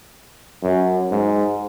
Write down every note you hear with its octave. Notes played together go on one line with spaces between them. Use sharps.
F#2
G#2